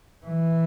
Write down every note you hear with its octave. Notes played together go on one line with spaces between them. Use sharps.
E3